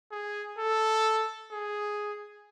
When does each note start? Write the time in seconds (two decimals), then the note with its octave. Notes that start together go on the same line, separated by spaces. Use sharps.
0.12 G#4
0.58 A4
1.51 G#4